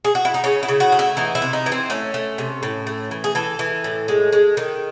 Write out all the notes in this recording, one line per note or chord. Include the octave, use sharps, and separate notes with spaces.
G#4
F#4
E4
D#4
C#3 C#4
E4
C#3
F#4
A3
E4
E3 D#4
E4
C3
D#4
E3
C4
A3 C#4
A3
C3
A2
A3
E3
G#4
E3 A4
E3
A2
G#3
G#3
D#3